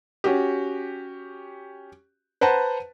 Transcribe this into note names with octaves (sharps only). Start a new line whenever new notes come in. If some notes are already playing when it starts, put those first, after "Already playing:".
C#4 F#4 G4
B4 C5 F#5 A5 A#5